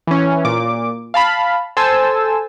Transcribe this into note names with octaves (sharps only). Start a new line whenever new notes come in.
E3 C#4
A#2 D6
F5 A5 B5
A4 C5 G#5 A5 E6